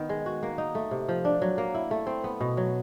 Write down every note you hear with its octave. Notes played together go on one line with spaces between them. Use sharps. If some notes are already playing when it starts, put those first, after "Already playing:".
Already playing: D#3 B3
G#3
F#4
A#3
D#4
A3
C3
F3
D4
F#3
A#3
E4
A3
C4
B3
B2
F#3